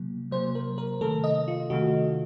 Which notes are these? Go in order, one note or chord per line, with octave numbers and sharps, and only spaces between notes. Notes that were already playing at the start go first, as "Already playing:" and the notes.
Already playing: C3 F#3 A#3
C3 F#3 A#3 C5
A#4
A#4
C3 D#3 A3 A4
D#5
F4
C3 D#3 A3 F#4